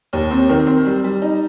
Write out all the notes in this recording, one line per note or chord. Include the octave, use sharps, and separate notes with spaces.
D#2
C4
D#3
C4
G3
G3
D#4